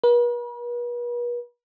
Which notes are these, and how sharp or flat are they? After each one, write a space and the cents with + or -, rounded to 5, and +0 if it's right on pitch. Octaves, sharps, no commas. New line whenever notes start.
B4 -45